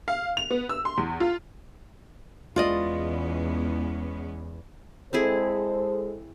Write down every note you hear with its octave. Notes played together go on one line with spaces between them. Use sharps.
F5
F7
B3
E6
C6
E2
F4
E2 G#3 B3 C#4 F4 D5 D#5
G#3 C4 E4 G#4 A4 C5